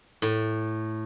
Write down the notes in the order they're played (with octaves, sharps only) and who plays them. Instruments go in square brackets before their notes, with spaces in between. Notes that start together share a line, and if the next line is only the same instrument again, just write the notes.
[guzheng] A2